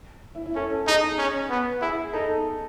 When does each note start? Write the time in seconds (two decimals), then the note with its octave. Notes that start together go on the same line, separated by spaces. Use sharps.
0.35 E4
0.46 E4
0.55 C#4 A4
0.87 D#4 G#4
1.18 C#4
1.50 B3
1.81 E4 G#4
2.13 D#4 A4